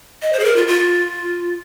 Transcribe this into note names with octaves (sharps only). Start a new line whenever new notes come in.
D#5
C5
G#4
A#4
F4
F4